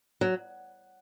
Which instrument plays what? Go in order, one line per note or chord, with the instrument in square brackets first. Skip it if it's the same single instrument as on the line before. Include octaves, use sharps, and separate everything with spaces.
[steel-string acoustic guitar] F#3